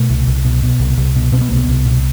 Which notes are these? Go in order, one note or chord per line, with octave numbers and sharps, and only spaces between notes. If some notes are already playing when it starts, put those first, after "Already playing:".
Already playing: B2 A3
C2
C2
B2
B2
C2
C2
B2
B2 C4
B3
C2 A#3
B3
C2
B2